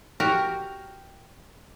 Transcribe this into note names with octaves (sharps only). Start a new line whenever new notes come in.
F#4 G4 A#4